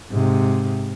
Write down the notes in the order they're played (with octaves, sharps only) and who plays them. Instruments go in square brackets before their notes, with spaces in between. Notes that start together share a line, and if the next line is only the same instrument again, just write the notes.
[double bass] G#2 C3